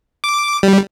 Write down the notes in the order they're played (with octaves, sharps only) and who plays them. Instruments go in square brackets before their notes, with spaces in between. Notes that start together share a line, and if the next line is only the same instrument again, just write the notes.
[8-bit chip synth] D6
G3